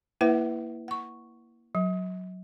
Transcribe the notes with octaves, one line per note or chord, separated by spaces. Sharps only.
A#3 E4 B4 C5 E5 F#5
F#5 C#6
F#3